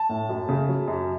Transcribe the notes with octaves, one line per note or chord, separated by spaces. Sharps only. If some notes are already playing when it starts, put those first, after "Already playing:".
Already playing: A5
A2
F#2
C#3
F#3
F#2